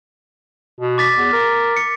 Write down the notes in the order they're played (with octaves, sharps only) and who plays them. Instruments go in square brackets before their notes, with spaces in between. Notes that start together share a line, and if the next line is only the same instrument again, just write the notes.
[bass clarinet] B2
[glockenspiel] D6 A6 B6
[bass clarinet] E2
A#4
[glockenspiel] C#7